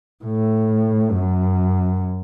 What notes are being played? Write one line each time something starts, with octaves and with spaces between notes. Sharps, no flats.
A2
F#2